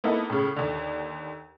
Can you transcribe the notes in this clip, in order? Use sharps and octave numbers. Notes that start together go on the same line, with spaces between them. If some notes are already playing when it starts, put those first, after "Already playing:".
A#3 B3 D#4 E4 A4
A2 C#3
D#2 D3